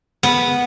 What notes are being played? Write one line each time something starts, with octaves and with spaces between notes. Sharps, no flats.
B3